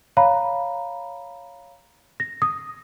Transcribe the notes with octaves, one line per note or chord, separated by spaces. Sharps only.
C#5 F5 A#5 B5
A#6
D#6